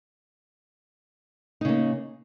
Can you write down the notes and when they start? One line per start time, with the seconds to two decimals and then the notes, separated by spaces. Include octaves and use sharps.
1.61 D#4
1.65 C#3
1.69 A#3